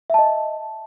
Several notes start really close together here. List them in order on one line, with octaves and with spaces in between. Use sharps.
E5 A5 D#5